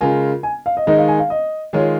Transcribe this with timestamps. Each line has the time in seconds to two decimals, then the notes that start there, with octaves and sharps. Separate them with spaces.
0.01 C#3 G#3 F4 A#4 G#5
0.43 G#5
0.66 F5
0.77 D#5
0.87 D#3 G#3 D#4 D#5
0.98 F5
1.08 G#5
1.19 F5
1.30 D#5
1.73 D#3 G#3 F4 G#4 C#5